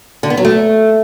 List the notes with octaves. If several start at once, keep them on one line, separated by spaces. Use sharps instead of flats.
D3
B3
F#3
A3